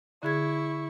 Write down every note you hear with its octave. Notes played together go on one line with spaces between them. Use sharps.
D3 E4 G#4 C#6 G#6